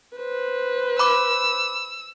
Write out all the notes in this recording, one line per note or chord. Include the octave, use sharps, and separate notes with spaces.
B4 C5
B5 D6 E6